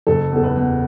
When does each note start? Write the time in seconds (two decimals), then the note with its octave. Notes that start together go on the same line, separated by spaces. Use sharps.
0.07 F#1 A4
0.31 E2 A4
0.44 B4
0.56 E2